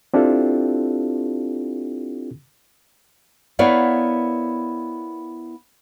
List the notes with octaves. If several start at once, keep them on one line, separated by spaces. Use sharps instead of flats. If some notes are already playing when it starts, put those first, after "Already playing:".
C4 D4 E4 F4 G4 A4
B3 E4 A#4 C#5 D5 F5